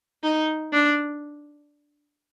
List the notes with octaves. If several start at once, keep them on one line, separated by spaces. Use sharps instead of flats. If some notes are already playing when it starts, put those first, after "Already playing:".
D#4
D4